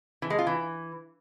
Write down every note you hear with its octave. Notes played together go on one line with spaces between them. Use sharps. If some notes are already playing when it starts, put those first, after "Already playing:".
E3
G#3
F4
E3